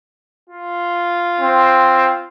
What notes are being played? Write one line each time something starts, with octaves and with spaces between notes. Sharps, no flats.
F4
C4